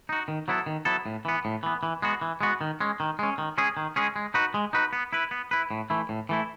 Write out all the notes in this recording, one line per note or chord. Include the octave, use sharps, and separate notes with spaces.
D#4 F#4
D#3
F#3 B3 E4 A4
D#3
F#3 B3 E4 A4
A2
E3 B3
A2
E3 B3
E3
G#3 B3 F#4
E3
G#3 B3 F#4
D#3
G#3 C#4
D#3
G#3 C#4
D#3
G#3 C#4 G#4
D#3
G#3 C#4 G#4
G#3
D#4 F#4 B4
G#3
D#4 F#4 B4
B3
E4 B4
B3
E4 B4
A2
E3 A3 E4
A2
E3 A3 E4